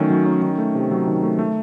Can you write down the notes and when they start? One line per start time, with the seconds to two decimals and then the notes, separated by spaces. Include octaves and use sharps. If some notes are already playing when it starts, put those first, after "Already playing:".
Already playing: D#3 F#3 A3 C#4
0.10 F#3
0.26 C#4
0.42 D#3
0.58 A3
0.75 C3
0.91 F#3
1.08 D#3
1.23 A3
1.39 A3